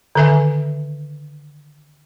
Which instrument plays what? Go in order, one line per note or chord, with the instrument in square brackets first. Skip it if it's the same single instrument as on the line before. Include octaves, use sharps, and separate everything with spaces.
[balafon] D3 D#3 B4 E5 G#5